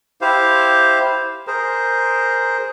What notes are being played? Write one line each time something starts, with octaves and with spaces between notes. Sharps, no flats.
E4 G4 C5 F5
G#4 A#4 C5